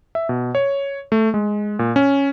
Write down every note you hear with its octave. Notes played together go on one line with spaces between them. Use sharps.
E5
B2
C#5
A3
G#3
A#2
C#4